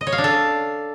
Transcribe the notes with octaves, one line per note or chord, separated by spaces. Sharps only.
D#5
C#5
F5
D4
A4